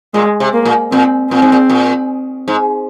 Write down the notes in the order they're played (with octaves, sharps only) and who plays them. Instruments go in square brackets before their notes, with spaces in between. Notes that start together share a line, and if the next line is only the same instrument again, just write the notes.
[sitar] A#2 [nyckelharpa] G#3
[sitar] C3
[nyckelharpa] A#3
[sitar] A#2
[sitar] A#2 [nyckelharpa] C4
[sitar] A#2 [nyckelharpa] C4
[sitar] G#2
A#2
A#2
G#2